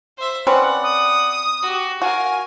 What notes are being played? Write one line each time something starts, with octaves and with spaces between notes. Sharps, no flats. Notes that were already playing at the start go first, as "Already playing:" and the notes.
C5 E5
C4 C#4 B4 D5 F#5
D#6
F#4 G4
F#4 A#4 F5 G#5